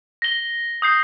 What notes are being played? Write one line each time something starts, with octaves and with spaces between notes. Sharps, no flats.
A#6 G7
D#6 G6 C7